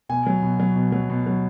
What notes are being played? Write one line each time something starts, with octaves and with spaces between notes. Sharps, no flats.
B2 G#5
F#3
B2
F#3
B2
F#3
B2
F#3